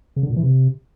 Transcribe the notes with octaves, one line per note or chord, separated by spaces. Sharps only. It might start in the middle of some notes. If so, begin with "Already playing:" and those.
C#3
D3
A#2
E3
C3